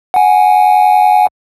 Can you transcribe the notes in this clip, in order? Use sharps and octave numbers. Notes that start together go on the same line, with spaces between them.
F#5 G#5